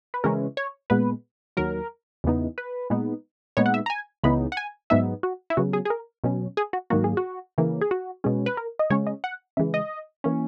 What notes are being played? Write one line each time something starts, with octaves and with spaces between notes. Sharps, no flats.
B4
C#3 E3 G#3 C#4 A#4
C#5
A#2 G#3 B3 B4
D#2 D#3 F#3 A#4
E2 C#3 E3 B3 D#4
B4
A#2 G#3 B3 D#4
A#2 G#3 B3 D#4 C#5
F#5
E5
A#5
G#5
C#2 C#3 E3 B3 D#4 B5
F#5
G#5
G#2 F#3 B3 D#4 E5
F#4
E4
C#3 F#3 B3 F#4
G#4
G#4
A#4
B2 F#3 C#4
G#4
F#4
G#2 D#3 F#3 A#3 F#4
G#4
F#4
C#3 E3 A#3
G#4
F#4
B2 G#3 C#4
B4
A#4
D#5
C#3 G#3 C#4 C#5
D#5
F#5
C#3 E3 G#3 E5
D#5
E3 A#3 C#4